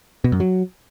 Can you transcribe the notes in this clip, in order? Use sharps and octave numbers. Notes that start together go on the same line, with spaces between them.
B2
F#2
F#3